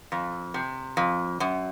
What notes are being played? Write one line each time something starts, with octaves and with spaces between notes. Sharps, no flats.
F2
C3
F2
F#2